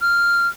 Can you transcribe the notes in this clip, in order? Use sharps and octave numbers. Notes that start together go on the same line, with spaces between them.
F6